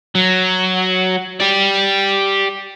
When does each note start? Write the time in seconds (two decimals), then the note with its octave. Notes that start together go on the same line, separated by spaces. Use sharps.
0.15 F#3
1.40 G4 D5